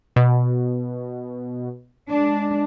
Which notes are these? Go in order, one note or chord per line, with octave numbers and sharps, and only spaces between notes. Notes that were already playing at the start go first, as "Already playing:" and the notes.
B2
G#3 D4